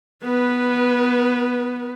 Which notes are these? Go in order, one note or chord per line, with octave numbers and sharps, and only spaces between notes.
B3 B4